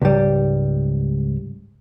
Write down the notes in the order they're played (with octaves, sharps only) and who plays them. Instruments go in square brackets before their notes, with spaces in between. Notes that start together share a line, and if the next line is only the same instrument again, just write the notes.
[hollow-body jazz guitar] C#2 G#2 G3